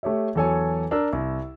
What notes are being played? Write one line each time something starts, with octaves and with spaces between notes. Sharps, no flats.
A3 G4 C#5 E5
E2 F#3 A4 C#5 G#5
D4 A#4 E6
C2